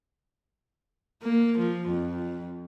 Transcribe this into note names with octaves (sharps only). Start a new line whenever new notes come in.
A#3
F3
F2